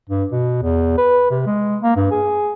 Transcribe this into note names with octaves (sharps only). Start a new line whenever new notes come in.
G2
B2
E2
B4
C3
G#3
A#3
G2
G#4